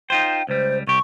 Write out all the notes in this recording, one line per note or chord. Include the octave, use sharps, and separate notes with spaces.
D#4 F4 C5 G5
C#2 G3 C5
C2 G4 C#6